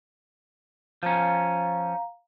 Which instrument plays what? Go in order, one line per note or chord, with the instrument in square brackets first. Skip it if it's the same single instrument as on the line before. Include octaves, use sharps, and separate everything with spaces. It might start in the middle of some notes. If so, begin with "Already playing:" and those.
[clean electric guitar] F3 C#4 [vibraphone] F5 A#5